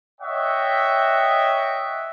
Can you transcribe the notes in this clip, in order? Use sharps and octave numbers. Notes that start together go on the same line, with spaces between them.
C#5 D#5 E5 F#5 G5